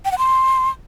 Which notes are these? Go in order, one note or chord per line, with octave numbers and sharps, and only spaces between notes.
G5
F#5
C6